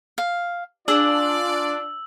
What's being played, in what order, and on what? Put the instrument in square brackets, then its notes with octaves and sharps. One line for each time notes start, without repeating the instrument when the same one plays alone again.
[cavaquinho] F5
[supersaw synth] D4 [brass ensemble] F4 D5 [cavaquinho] G#4 [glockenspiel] E6 F#7